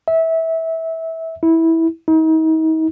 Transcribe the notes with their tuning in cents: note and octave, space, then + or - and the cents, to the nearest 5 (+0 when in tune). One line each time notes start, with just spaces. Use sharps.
E5 -20
E4 -15
D#4 +40